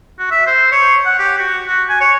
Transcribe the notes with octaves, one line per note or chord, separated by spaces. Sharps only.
F#4
E5
C5
C#5
F#5
G4
F#4
F#4
G#5
C#5